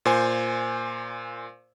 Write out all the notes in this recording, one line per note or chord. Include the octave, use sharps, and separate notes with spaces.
A#2 C5 G#5